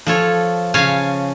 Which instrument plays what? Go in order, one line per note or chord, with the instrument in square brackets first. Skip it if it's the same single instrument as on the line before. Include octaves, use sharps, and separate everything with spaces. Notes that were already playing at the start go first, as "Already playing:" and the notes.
[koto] F3 A4 C#5
C#3 C#5 F5 G#5 A5